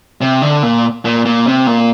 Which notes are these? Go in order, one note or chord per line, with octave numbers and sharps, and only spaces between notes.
C3
D3
A#2
A#2
A#2
C3
A#2